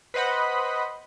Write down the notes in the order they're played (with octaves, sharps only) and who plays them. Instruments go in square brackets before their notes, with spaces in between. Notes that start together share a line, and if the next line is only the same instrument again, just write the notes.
[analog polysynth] B4 C5 D#5 F#5 B5